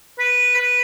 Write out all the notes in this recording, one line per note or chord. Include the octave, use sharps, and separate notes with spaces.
B4
B4